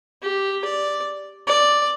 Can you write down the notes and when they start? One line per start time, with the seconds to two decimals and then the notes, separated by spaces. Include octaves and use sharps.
0.23 G4
0.65 D5
1.47 D5